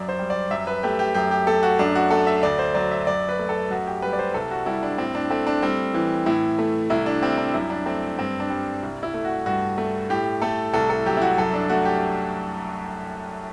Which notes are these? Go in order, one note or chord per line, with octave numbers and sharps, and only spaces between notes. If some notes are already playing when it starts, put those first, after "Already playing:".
Already playing: F#2 F#3 D5
C5
G3
D5
F#2 E5
B4
A3 G4
G4
F#2 G4
G4
A3 A4
F#4
F#2 D4
F#4
A3 A4
E5
D2 D5
C5
F#3 D5
E5
F#2 D5
B4
A3
A4
F#2 F#4
G4
G3 B4
D5
C5
C2 A4
F#4
G3 E4
D4
A2 C4
D4
A3 C4
D4
G3 C4
E3
A2 E4
A3
C2 E4
D4
G3 C4
D4
F#2 E4
D4
A3 C4
G2 C4
D4
G3
C2
E4
A3
F#4
G2 F#4
A3
A2 G4
A3 A4
C2 A4
A4
F#3 G4
E4
F#4
F#2 A4
D4
A3 F#4
G4